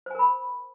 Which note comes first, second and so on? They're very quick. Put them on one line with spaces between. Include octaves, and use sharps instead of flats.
C5 G#5 A#4 B5